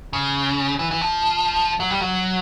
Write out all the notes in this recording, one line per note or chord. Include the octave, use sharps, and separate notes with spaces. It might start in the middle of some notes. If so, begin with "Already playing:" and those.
C#3
E3
E3
F3
F#3
G3
F#3